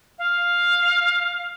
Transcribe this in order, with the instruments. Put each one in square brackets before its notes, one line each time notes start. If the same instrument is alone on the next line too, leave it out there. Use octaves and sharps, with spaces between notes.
[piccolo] F5